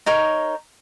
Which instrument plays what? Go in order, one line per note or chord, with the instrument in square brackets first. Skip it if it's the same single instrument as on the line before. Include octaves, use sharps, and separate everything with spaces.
[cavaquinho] D#4 A#4 C#5